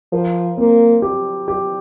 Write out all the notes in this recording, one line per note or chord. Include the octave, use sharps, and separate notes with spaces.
F3 A#4
A#3 C4
G4
G4